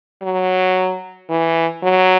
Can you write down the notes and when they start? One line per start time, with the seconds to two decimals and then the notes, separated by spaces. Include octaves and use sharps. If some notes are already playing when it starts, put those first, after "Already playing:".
0.23 F#3
1.30 E3
1.83 F#3